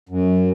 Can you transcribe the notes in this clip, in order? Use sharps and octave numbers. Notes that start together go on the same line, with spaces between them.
F#2